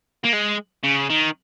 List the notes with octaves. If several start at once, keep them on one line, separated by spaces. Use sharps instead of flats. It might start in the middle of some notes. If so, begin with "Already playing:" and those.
A#3
G#3
C#3
D#3